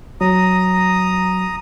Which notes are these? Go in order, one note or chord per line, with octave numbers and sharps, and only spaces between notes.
F#3 A#5 D#6